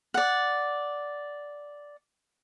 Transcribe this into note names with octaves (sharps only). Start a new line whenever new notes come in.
D5 F#5